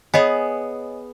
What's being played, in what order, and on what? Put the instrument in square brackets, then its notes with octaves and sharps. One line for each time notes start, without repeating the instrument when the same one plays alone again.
[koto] B3 G#4 [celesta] C#5 D#5 G#5